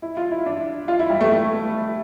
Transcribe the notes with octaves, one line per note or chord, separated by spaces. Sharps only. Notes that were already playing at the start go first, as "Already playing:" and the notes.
E4
F4
E4
D4
F4
E4
G3
A3
A3